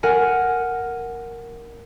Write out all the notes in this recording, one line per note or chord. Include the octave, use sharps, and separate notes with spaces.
A#4 F#5 G#5